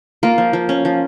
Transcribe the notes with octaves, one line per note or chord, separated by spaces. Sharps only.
A#3 F4
F3
F3
C#4
F3